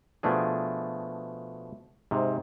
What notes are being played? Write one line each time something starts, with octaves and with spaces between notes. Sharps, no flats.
B2 F3 A3 D4 G#4
G#2 C3